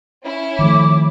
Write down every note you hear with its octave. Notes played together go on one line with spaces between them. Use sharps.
C#4 E4
D#3 F3 A3 D6